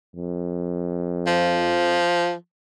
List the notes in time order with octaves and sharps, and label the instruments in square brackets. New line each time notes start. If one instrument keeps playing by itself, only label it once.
[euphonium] F2
[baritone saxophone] F3